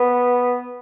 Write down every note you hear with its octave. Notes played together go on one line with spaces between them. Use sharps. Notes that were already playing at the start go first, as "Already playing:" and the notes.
Already playing: B3